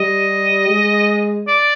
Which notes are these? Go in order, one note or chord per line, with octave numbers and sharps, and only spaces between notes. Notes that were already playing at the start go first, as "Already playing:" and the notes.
Already playing: G3 D#5
G#3
D5